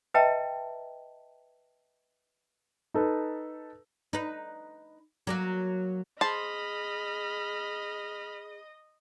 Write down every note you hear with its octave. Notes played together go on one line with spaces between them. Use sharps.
B4 D#5 E5 G5 A5 A#5
D#4 A4 B4
D#4 B4
F#3 A#3 F#4
G#4 C5 D#5 A5 B5 F6